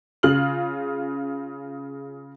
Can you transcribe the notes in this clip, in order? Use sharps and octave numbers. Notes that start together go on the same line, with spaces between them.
C#3 F4 F6 F#7